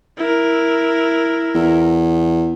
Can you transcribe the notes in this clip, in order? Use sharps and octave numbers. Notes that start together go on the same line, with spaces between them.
E4 A#4
E2